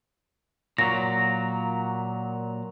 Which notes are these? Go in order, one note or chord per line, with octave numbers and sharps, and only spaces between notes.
A#2 F#3 A#6